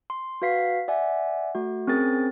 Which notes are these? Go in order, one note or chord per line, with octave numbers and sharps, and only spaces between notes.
C6
F#4 B4 F5 B6 C7
D5 E5 F#5 G#5
A3 F#4
C4 C#4 G#4 A#4 C5 A6